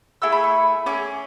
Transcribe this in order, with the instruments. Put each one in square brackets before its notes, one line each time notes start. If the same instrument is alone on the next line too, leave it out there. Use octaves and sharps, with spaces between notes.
[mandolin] A3 E4 G#4 E6
B5
C#6
C#4 G#4 D6